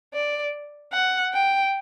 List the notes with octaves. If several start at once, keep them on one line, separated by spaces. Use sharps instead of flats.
D5
F#5
G5